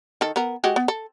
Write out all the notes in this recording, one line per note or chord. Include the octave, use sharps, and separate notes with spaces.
D#3 A4
B3 A#4
G#3 F#4 G4
B3
A4